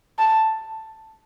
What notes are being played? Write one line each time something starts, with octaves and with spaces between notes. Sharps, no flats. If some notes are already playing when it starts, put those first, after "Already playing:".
A5